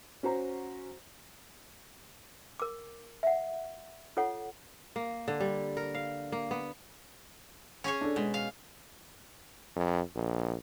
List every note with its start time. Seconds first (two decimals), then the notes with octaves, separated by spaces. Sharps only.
0.23 C#4 F#4 C5 A#5
2.60 A#4 D6
3.23 E5 F#5
4.17 F4 A4 C#5 F#5
4.96 A#3
5.28 D3
5.40 G3
5.77 A#4
5.95 F5
6.32 A#3
6.51 B3
7.84 C#4 G#4 C#5
8.01 D4 A4
8.16 B2 G#3
8.34 F5
9.76 F2
10.15 A#1